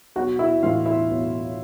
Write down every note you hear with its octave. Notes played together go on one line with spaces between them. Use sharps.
B1 F#4 F#5
E4 E5
A2 E3 F4 F5
E4 E5
B1